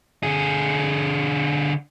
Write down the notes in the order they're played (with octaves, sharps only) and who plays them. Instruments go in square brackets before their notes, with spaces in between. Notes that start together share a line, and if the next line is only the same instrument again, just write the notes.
[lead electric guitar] D3 G#4